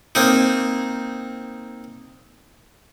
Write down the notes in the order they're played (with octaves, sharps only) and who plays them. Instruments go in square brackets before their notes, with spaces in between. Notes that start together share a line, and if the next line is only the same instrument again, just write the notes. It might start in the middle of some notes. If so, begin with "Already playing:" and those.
[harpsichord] A#3 C4 D#4